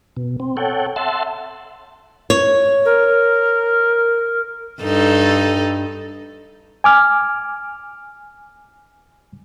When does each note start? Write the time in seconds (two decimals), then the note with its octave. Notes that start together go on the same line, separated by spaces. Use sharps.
0.17 B2
0.40 C4
0.57 A4 C#5 F#5 G5
0.96 E5 F#5 A5 C6
2.30 C#5
2.85 A#4
4.82 G2 D#4 A4
6.84 G#5 D6 F6